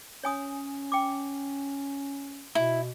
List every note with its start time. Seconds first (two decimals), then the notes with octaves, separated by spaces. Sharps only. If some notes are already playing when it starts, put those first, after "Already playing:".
0.24 C#4 C#5 G#5 D#6
0.92 G5 D6
2.55 B2 E4